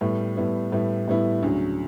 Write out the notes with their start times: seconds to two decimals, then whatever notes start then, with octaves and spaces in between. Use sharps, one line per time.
0.01 A2 G3 B3 E4
0.37 A2 G3 B3 E4
0.72 A2 G3 B3 E4
1.08 A2 G3 B3 E4
1.43 D2 C#3 F#3